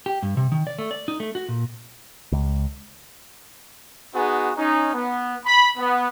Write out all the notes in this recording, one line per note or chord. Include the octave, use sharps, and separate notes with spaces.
G4
G2
C3
D#3
D5
A3
D5
D#4
A3
F#4
A#2
C#2
B3 D#4 F#4 G#4
C#4 D#4
B3
B5
B3